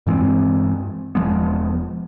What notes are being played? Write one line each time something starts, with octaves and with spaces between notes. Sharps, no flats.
G2 E3 G#3 C4
E1 F3 G#3 B3